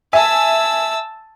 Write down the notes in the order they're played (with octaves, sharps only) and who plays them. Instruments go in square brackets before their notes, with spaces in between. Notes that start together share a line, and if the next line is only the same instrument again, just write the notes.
[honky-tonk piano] E5 G#5 [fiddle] A5 E6